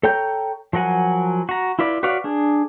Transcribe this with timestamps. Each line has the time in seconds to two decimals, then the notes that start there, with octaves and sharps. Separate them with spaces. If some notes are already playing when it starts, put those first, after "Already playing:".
0.03 A4 C#5 G5 A#5 G6
0.73 F3 F#3 A#4 F#5 G#5
1.49 F#4 A#5
1.79 E4 F4 B4 D5
2.03 F#4 B4 C#5 D5 F5
2.24 D4 G#4